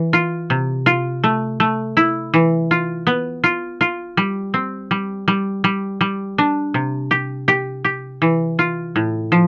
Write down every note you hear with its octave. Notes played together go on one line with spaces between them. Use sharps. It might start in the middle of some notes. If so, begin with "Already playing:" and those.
Already playing: E3
F4
C3
F4
A3
A3
E4
E3
F4
B3
F4
F4
G3
C4
G3
G3
G3
G3
D4
C3
G4
G4
G4
E3
F4
A2
F3